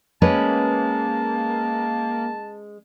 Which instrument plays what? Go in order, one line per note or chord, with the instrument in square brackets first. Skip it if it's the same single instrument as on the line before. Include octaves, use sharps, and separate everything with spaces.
[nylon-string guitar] G#3 C#4 B4 [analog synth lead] A#3 [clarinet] A5